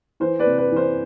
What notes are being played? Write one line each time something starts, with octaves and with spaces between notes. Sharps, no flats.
E3 C5
B4 D5
C3
B4
E3
C5